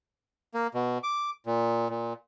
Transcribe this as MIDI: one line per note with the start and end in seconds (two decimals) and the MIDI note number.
0.54 0.67 58
0.74 0.98 47
1.03 1.31 86
1.46 1.89 46
1.90 2.13 46